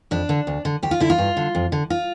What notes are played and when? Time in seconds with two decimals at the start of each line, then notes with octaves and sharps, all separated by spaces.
0.11 F2 D4
0.29 D3
0.47 D2
0.65 D3
0.83 D2 G4
0.91 F4
1.00 D3 E4
1.10 F4
1.18 G2
1.37 D3
1.55 F2
1.72 D3
1.90 F4